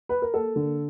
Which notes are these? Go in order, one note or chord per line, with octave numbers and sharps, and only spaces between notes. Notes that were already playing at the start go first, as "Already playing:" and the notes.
B4
A#4
A#3 A4
D3